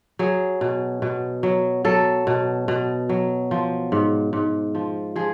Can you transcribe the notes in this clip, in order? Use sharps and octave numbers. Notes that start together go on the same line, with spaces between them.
F#3 G#4
B2
B2
F#3
F#3 A4
B2
B2
F#3
F3
G#2
G#2
F3
F3 G#4